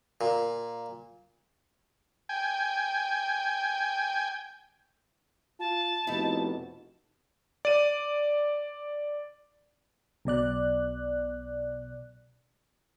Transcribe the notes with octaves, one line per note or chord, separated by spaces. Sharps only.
A#2
G5 G#5
F4 A5
F1 B2 D#4 E4
D5 D#7
B1 B2 D5 F#6